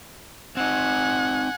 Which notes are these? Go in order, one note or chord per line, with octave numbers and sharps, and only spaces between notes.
C4 D#4 F#5 G#5